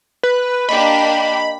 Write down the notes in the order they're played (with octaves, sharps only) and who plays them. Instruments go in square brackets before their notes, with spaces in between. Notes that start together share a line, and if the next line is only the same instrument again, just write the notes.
[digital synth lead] B4
[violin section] A#3 D4 G4 [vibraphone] D#5 [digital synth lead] B5